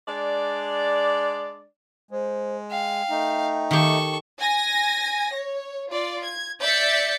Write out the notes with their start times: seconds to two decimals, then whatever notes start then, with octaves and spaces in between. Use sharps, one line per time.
0.07 G#3 D4 D5
2.11 G#3 C5
2.71 F5 G5
3.10 A3 D#4
3.71 D#3 G4 A4 C#6
4.40 G#5 A#6
5.34 C#5
5.91 F4 D5
6.26 G#6
6.62 D5 E5 G6 A6 B6 C#7